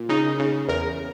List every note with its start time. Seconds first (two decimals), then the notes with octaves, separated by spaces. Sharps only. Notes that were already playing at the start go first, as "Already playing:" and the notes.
Already playing: A#2
0.09 C#3 D#4
0.40 C#3
0.69 E2 A#4